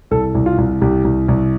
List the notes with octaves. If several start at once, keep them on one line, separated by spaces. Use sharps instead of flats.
C2 A4
C2
F4
C2
C2 G4
C2
C2